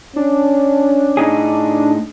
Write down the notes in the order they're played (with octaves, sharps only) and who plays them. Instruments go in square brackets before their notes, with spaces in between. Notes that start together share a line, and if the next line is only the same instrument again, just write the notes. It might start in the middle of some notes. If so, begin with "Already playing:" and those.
[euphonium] C#4 [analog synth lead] D4
[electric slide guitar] A2 D#4 G#4